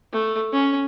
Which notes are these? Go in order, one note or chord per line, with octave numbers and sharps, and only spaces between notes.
A3
C#4